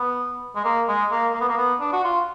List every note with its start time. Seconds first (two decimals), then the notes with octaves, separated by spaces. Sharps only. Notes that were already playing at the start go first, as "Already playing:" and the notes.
Already playing: B3
0.55 G#3
0.64 A#3
0.88 G#3
1.11 A#3
1.34 A#3
1.41 B3
1.49 A#3
1.57 B3
1.80 D4
1.93 F#4
2.04 F4